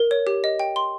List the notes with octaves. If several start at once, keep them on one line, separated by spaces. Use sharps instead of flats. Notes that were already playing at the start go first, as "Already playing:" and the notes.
Already playing: A#4
C#5
G4
D#5
G5
C6